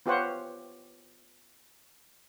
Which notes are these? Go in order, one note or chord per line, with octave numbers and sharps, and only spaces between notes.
B3 F4 G4 C5 C#5 F#5